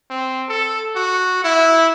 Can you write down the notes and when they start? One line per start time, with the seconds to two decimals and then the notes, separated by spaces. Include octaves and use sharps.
0.10 C4
0.49 A4
0.96 F#4
1.44 E4